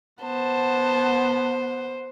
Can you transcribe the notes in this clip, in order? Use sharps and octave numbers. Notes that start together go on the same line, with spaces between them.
B3 C5 F#5 A5